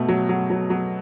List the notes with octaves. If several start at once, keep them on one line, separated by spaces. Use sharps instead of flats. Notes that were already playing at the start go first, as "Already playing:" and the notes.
Already playing: B2 A3
F#3
F#3
F#3
F#3